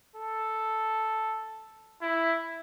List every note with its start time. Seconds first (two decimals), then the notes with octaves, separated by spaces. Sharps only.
0.16 A4
2.02 E4